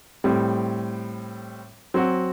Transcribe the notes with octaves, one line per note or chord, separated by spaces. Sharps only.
A2 G3 C4
F#3 C4 F#4